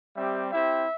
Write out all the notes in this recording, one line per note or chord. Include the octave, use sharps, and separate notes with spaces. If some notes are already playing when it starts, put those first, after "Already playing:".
G3 C4 G4 E5
C4 E4 G4 E5